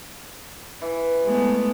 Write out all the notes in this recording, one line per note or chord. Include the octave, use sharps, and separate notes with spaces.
E3
G#3 A3 B3